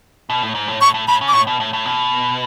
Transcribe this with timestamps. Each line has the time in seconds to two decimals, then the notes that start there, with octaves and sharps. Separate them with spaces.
0.30 B2
0.42 A2
0.55 G#2
0.68 A2
0.81 A2 C#6
0.94 A2
1.08 A2 B5
1.21 C#3
1.28 D6
1.33 A2 C#6
1.47 B2
1.60 A2
1.73 A2
1.86 B2